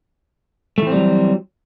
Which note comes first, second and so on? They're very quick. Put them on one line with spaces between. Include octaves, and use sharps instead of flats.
A3 E3 C4 G3 F#3